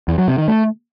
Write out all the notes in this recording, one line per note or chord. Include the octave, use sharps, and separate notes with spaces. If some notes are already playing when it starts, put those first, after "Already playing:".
E2
F#3
C3
D#3
A3